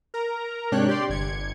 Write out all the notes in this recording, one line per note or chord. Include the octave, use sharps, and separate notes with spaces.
A#4 A#5
G#2 C3 D4 C#5 G5 F#6
G4 D5 G5 C6
G1 G#6 C#7